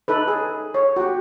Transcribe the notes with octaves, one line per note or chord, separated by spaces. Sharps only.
D#4 A4 B4
G#4
C#5
F#4 G4